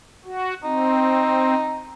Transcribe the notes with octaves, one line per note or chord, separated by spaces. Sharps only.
F#4
C4 D#4